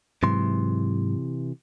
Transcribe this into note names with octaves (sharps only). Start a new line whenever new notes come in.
G#2 C3 E3 F#3 G#3 C6